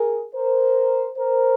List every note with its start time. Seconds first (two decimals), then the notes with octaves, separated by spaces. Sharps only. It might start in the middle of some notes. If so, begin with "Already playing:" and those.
Already playing: G#4 A#4
0.34 A#4 C5
1.17 A#4 C5